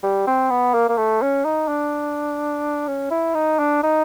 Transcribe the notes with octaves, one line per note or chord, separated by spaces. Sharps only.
G3
C4
B3
A#3
A#3
A3
C#4
D#4
D4
C#4
E4
D#4
D4
D#4